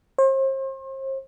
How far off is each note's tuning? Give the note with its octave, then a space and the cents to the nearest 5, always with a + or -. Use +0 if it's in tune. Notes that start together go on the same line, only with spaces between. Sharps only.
C5 +40